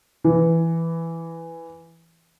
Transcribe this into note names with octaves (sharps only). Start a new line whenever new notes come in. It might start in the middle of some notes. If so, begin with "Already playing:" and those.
E3